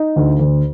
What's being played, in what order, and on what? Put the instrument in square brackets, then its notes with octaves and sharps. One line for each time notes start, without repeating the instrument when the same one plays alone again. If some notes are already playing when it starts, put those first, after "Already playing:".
Already playing: [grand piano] D#4
D2
D2